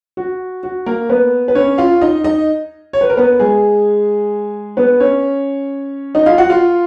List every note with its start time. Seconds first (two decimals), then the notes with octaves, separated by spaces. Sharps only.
0.17 F#4
0.63 F#4
0.86 A#3 A#4
1.09 B3 B4
1.48 B4
1.55 C#4 C#5
1.78 F4 F5
2.01 D#4 D#5
2.24 D#4 D#5
2.93 C#5
3.01 B4
3.10 A#4
3.17 B3 B4
3.40 G#3 G#4
4.77 B3 B4
5.00 C#4 C#5
6.15 D#4 D#5
6.26 F4 F5
6.38 F#4 F#5
6.50 F4 F5